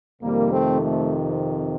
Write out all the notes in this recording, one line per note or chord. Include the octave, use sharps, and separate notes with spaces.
F2 C3 D#3 G3 A#3
A3 C4
A3